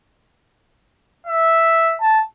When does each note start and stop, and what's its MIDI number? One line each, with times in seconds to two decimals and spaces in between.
1.27 1.97 76
2.01 2.22 81